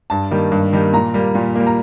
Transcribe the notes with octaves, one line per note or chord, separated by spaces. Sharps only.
G2 A5
D#3 G3 A#3
G2
D#3 G3 A#3
A#2 A#5
G3 A#3
A#2
G3 A#3
A#5